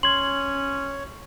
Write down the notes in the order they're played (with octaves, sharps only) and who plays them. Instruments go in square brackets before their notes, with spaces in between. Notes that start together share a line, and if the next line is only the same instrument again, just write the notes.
[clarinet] C#4 [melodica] C#5 [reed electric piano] C6 G#6 [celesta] F#7